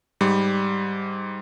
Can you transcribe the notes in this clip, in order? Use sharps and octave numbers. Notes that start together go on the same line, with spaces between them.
G#2 G3 B5